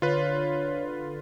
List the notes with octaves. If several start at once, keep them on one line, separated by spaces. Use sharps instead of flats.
D3 F4 B4 C#5